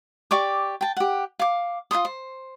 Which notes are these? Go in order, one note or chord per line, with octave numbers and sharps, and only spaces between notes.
G4 D5 C#6 D6
G5 A5
G4 F#5
F5 D6
F4 B4 C6 D#6
C5